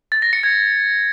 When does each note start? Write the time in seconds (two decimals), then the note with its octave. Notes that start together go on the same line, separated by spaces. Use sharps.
0.12 A6
0.22 A#6
0.33 C#7
0.43 G#6